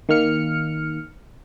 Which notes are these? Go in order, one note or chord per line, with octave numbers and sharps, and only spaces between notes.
D#3 A#3 F6 C#7